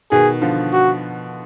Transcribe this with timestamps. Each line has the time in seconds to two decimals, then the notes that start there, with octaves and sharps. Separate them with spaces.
0.12 B2 D#3 G#4
0.42 D3 F3
0.73 F#4